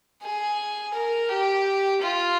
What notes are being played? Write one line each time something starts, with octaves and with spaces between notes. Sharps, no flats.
G#4
A#4
G4
F4